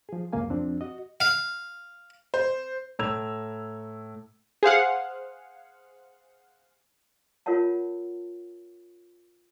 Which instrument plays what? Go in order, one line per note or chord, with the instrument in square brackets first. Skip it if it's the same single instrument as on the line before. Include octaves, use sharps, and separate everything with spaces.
[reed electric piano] F3 G#4
C#2 F#2 C#3 A#3 F5 G#5
F2 F3 C4 D4
F#4 D#5
[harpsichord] F5
[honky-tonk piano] C5
[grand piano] A2 A#5 E6 G#6 F7
[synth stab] G#4 C5 F5 F#5
[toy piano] F4 A#4 C#5 F#5 A5